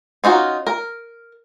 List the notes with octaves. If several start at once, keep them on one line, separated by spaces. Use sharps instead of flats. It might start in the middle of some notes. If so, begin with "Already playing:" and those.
C#4 D#4 F4 F#4
A#4